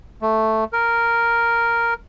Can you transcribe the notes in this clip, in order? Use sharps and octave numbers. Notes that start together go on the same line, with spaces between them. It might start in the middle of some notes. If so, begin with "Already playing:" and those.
A3
A#4